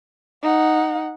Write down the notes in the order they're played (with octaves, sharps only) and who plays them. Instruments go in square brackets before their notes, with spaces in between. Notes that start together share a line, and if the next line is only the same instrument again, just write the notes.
[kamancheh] D#4 F#5